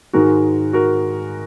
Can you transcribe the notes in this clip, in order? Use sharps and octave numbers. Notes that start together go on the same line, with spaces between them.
G#2 D#3 G#3 F#4 A#4
F#4 A#4